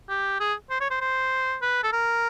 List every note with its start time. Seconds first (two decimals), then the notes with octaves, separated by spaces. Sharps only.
0.09 G4
0.40 G#4
0.70 C5
0.80 C#5
0.90 C5
1.01 C5
1.62 B4
1.83 A4
1.93 A#4